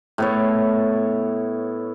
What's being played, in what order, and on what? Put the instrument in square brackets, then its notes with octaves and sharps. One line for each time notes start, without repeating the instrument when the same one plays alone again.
[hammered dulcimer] A2 B3 C#5